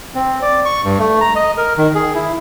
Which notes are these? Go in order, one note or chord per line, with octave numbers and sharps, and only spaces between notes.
C4
D5
C#6
G2
A3
A#5
D#5
A#4
D#3
G#4
E4